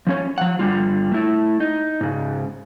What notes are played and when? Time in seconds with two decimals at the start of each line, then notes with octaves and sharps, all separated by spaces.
0.07 F3 C#4 C#5
0.38 F3 F#5
0.59 G2 D3 G3 F4
1.12 A3 E4
1.60 D#4
2.01 G#2 C#3